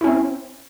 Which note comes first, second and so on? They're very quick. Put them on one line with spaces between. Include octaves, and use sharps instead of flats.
E4 C#4 C4